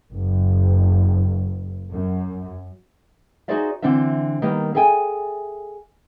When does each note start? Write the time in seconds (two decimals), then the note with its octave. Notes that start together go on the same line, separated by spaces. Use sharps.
0.11 F#1
1.93 F#2
3.48 D#4 F#4 G#4 C5 D5 E5
3.82 D3 E3 C4 D4 E5
4.42 D#3 G3 A#3 B3
4.75 G#4 A4 E5 G5 G#5